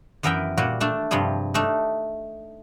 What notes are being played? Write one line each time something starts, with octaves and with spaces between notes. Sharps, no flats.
F#2 E3 B3 A#4 E5 G5
A#2 G3 F#4
A3 D4 A5
G2 C3 F3 G3 G#4
A3 D4 D#4